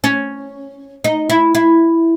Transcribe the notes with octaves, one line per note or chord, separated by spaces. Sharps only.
C#4
D#4
E4
E4